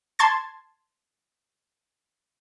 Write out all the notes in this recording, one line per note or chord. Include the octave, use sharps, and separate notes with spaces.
A5 C6 G#6 A6